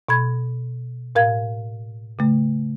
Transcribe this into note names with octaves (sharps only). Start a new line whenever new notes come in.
B2 B5 G#6
A2 A#4 F5 G#6
C#3 A3